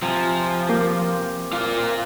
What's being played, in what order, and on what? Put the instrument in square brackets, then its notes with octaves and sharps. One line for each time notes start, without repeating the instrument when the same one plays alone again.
[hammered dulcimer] C3 G#5 [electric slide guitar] F3
[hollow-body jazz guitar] A#3 [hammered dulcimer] G4
[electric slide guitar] F4 A#4 F5